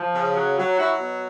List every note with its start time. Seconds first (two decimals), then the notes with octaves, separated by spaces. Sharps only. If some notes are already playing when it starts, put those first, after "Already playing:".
Already playing: F3
0.14 C#3
0.35 F#3
0.58 F#3
0.78 F#3 E4 F#4
1.00 B2